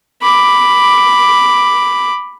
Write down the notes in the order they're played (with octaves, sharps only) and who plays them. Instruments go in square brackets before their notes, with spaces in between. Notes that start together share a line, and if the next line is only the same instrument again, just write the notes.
[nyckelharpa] B5 D6